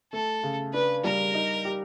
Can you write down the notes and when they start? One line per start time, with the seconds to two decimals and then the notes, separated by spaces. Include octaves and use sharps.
0.13 A3 A4
0.43 C#3
0.74 D4 B4
1.04 G3 A#4
1.34 D#4
1.65 G4